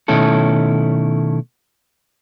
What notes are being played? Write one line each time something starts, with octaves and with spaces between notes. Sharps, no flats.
B2 D#3 A3 C#4 E4 A4